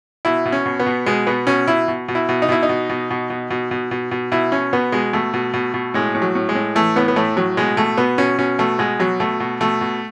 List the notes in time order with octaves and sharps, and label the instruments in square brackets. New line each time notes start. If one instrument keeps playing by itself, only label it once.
[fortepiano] B2 E4
B2
C#4
B2
B3
B2
B2 G#3
B2 B3
B2 C#4
B2 E4
B2
B2
E4
B2
D#4
B2 E4
D#4
B2
B2
B2
B2
B2
B2
B2
B2
B2 E4
B2 C#4
B2 B3
B2 G#3
B2 A3
B2
B2
B2
A2 G#3
A2
F#3
A2
G#3
A2
E3 A3
A2 B3
B3
A2 A3
A2 F#3
B2 G#3
B2 A3
B2 B3
B2 C#4
B2 C#4
B2 A3
B2 G#3
B2 F#3
B2 A3
B2
B2 A3
B2